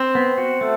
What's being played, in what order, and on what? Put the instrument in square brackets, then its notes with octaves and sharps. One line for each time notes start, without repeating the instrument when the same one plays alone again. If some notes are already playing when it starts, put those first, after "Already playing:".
Already playing: [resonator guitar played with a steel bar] C4
[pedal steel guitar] B3
F#4
A3